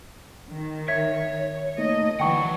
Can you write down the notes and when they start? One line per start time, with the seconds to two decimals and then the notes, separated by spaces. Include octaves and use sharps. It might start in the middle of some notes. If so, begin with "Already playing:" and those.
0.51 D#3
0.88 C#5 E5 G#6 B6
1.78 A3 A#3 D#4 D#5
2.20 D3 E3 F#3 G3 F#5 G5 A5 C#6